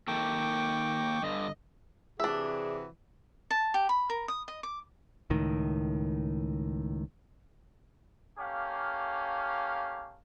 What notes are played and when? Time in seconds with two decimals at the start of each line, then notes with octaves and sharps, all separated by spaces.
0.08 D#3 A#3 A4 G5 C#6 D6
1.23 G2 D3 D#5
2.20 C3 E3 D4 F#4 G#4 E5
3.51 A5
3.74 G4
3.89 B5
4.10 A#4
4.28 D#6
4.48 D#5
4.63 D6
5.30 C#2 A2 D#3
8.38 A3 A#3 C#4 G4 F5